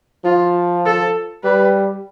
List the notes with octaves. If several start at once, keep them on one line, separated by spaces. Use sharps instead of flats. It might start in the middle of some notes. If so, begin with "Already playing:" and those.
F3 F4
A4
G3 B4